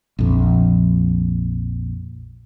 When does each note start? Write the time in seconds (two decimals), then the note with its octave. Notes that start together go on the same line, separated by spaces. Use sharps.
0.19 A#1 F2